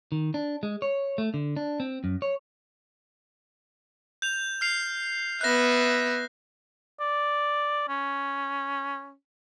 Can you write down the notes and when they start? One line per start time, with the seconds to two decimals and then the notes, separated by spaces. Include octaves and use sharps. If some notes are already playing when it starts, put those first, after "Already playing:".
0.12 D#3
0.34 D4
0.63 G#3
0.82 C#5
1.18 A3
1.34 D3
1.57 D4
1.80 C4
2.04 F#2
2.22 C#5
4.22 G6 F7
4.61 F6 C7 F7
5.41 B3 E5 F#6 A#6
7.00 D5
7.89 C#4